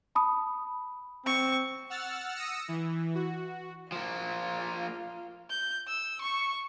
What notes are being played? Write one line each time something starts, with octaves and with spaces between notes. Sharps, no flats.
A5 B5 D#6
C4 C#6
F#5 E6 F6 A6
D#6 E6 A#6 C#7
E3
F#4
F3 A#3 F4
G6
E6
C#6